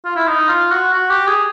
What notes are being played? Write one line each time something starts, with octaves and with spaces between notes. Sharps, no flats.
F4
E4
D#4
F4
F#4
F#4
G4
G#4